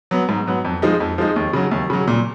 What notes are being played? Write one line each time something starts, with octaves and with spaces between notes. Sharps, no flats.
F#3 B3
G#2
F#3 B3
F2
F3 G#3 D#4
F2
F3 G#3 D#4
D#2
C#3 F#3
D#2
C#3 F#3
A#2